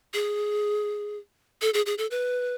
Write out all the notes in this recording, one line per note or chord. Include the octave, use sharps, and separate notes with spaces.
G#4
A4
G#4
G#4
A4
B4